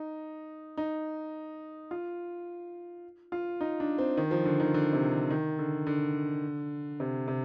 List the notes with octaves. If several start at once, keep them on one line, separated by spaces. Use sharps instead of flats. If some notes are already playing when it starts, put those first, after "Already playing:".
Already playing: D#4
D#4
F4
F4
D#4
D4
C4
D#3
F3
D3
D#3
D3
C3
D3
D#3
D3
D3
C3
C3